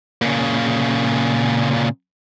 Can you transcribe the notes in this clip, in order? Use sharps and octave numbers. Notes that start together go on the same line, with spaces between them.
A#2 C#3